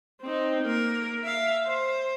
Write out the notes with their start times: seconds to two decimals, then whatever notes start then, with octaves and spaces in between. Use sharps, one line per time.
0.22 C4 D#4
0.63 A#3 A#4
1.24 E5 F5
1.66 C5